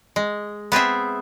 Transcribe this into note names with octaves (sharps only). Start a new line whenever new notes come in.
G#3
B3 C4 G#4 E5